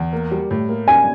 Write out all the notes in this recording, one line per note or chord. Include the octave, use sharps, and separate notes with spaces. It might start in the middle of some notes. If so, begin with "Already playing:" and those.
Already playing: E2
A#3
G3
A2
A#3
G3 G#5